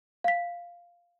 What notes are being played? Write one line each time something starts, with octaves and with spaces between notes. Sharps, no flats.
F5 B6